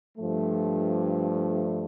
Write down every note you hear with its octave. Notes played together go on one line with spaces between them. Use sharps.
G2 F3 A3